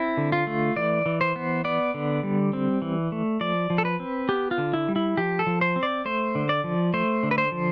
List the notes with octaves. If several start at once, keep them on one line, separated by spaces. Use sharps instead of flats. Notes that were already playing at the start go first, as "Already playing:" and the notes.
Already playing: C4 E4
D3
F4
A3
E3 D5
E3
C5
B3
B3 D5
D3
G3
C4
E3
A3
F3 D5
F3
A4
B4
C4
B3 G4
F4
D3
E4
G3
E4
F3 G4
A4
F3
C5
C4
D5
A3 C5
D3
D5
F3
A3 C5
D3
B4
C5
F3